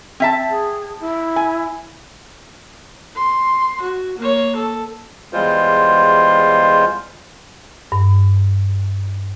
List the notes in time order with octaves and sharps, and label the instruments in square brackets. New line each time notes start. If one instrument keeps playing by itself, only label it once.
[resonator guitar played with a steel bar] C4 E5 A5
[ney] G#4
E4
[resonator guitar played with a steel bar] G#5
[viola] C6
F#4
A#3 C#5
A4
[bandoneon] E2 G3 G#3 F4 C5
[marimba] G2